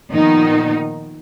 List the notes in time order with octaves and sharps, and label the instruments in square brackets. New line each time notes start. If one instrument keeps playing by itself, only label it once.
[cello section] A#2 D#3 F3 B3 D#4